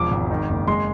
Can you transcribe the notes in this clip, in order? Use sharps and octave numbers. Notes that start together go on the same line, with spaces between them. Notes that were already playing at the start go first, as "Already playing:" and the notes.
Already playing: E1 F3 D6
G#1
D#3
F#1
G#3 C6